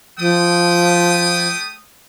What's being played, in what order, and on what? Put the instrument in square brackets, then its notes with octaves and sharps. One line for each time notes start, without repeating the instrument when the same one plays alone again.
[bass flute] F3 [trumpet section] A3 G5 D#6